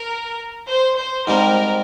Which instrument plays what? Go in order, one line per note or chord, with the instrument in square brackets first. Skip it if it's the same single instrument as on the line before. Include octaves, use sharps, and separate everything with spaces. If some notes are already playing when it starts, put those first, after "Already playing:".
Already playing: [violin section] A#4
C5
C5
[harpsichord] G#2 G3 C4 [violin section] A#4